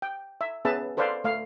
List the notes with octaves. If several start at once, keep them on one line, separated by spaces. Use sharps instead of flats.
G5
E5
B3 C#4 G#4 B4 E5 A5
A4 B4 C5 D5 F5
A3 F5